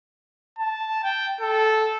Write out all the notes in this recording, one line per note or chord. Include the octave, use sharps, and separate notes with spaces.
A5
G5
A4